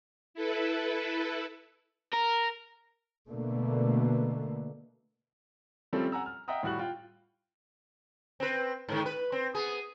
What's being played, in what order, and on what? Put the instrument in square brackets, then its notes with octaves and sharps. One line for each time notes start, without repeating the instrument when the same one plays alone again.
[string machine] E4 A4 B4
[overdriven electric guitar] A#4
[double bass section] B2 D3 A3 A#3
[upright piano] F3 G3 A3 C4 C#4 A4
F#5 G#5 A#5 E6
F6
D#5 E5 F#5 G5 A#5 D#6
A2 G3 F#4 F#6 F#7
F4 G5
[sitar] C4 B4
G#2 D#3
B4
C4
B3 G#4